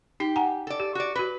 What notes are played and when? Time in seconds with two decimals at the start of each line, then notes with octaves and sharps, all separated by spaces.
0.20 D#4 G4
0.36 F#5 G#5 A#5
0.67 A4 D5
0.80 G4
0.95 F#4 D5
1.16 F#4 B4 B5